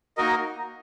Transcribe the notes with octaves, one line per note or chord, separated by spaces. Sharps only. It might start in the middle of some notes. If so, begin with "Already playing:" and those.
A#3 D#4 F#4 A#4 D#5